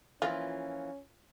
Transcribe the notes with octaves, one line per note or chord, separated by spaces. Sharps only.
E3 F3 A#3 C#4 F4